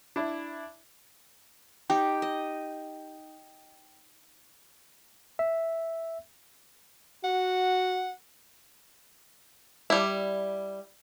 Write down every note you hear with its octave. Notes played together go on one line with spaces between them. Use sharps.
D4 E4
D#4 G4 G5
D#5
E5
F#4 F#5
G3 E4